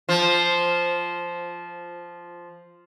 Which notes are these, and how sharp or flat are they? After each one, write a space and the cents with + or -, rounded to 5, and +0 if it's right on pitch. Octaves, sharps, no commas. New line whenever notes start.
F3 -5